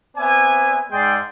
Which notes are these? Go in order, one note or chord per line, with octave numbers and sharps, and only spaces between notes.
B3 C4 D5 E5 G#5
G#2 G#3 G#4 D5 G5 C6